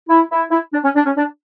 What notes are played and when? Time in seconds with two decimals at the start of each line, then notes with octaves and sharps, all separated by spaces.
0.09 E4
0.31 E4
0.51 E4
0.73 D4
0.84 C#4
0.95 D4
1.06 C#4
1.16 D4